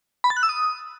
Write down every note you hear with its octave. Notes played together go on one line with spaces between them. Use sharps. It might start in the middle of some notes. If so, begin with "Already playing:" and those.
B5
A6
F#6
E6
D#6